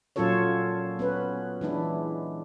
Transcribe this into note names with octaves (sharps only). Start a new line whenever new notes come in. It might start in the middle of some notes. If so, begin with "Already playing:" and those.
A#2 F#3 C#4 F4 A4 C#5
B3 C#4 B4
E3 G#3 D4 E4